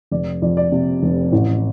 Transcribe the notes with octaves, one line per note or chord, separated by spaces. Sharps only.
F1 D5
F2 D5
D5
C3
F1
A1